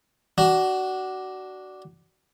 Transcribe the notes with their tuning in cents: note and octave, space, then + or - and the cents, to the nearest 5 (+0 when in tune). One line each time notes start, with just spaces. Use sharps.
D4 +0 F#4 +20